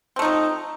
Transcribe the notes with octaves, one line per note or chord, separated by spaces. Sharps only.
F3 A3 C4 D#4